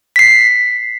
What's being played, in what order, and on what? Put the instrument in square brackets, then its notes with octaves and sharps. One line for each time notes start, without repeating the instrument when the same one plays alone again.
[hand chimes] B6 C7